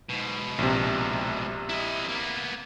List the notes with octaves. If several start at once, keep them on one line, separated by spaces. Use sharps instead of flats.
G#2 B2
A#1 C3
E4 D#5
A#3 B3